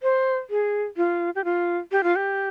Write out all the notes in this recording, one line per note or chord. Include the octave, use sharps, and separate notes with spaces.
C5
G#4
F4
G4
F4
G4
F4
G4